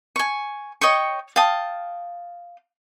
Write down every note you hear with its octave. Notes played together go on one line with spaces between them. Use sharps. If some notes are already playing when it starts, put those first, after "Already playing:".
G#5 C#6
C#5 D#5 G5 C#6
F5 G5 A5 D#6